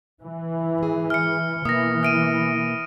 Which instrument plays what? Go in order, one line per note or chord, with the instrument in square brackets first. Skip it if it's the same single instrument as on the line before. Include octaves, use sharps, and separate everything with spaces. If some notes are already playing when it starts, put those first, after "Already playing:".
[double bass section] E3
[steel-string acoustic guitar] G#2 G#4
[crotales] F6 C#7
[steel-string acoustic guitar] B2 A#3 E5 [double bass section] E3 [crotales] D#6 A#6
[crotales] F6 D7 D#7